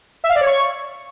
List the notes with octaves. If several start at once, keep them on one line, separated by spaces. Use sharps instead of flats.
E5
F5
D5
C#5
C#6